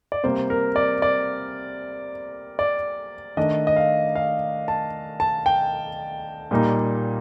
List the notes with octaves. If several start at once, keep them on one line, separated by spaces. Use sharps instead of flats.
D5
C3 G3 A#3 C5
A#4
D5
D5
D5
D#3 A3 D4 D#5
D#5
F5
F5
A5
A5
G5
A#2 G3 A#3 D#4